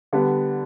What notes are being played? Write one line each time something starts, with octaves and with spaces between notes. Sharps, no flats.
D3 G3 B3